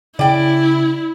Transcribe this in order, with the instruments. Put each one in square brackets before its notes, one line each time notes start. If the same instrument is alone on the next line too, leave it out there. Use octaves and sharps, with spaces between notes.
[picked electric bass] C#3 [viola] E4 [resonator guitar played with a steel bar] D5 G5